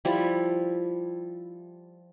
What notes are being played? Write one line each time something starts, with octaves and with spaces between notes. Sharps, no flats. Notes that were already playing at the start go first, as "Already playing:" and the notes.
F3 G3 E4